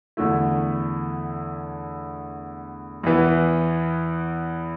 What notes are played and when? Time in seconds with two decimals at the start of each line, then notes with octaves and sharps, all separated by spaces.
0.17 E2 D3 A3 E4
3.03 E2 E3 B3